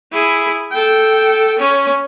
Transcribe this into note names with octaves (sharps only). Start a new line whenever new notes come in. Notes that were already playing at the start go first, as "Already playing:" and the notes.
E4 G#4
A4 G5
C#4